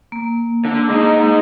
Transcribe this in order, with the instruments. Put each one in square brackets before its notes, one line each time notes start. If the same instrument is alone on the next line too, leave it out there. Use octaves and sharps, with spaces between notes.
[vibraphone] A#3
[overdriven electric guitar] D3
G#3 D#4